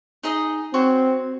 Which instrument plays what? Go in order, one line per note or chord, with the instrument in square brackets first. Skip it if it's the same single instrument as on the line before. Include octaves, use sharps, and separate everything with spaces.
[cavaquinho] D#4 G#4 D#5
[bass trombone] C4 [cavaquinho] F#4 C5 C#5